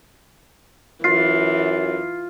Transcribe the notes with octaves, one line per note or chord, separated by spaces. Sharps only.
F#2 E3 F4 C7